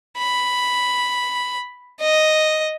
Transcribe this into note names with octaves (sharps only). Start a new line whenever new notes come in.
B5
D#5